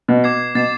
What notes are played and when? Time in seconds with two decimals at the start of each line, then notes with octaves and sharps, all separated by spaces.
0.08 B2
0.24 D6 G#6 C7
0.55 B2 A6 C7 E7